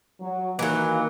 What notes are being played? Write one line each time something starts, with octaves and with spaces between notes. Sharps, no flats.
F#3
D#3 E3 F#3 A#3